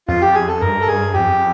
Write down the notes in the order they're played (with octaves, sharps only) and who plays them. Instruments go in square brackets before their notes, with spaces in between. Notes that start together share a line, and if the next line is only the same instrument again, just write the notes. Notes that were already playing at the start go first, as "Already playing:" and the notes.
[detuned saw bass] F2 [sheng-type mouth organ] F4
[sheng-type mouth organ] G4
G#4
A4
[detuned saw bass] G2 [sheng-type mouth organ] A#4
[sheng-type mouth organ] A4
[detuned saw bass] G2 [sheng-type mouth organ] G#4
[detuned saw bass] F2 [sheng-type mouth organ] G4